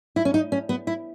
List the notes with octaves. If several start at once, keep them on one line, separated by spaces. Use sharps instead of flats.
E4
C#4
D#4
C#4
B3
E4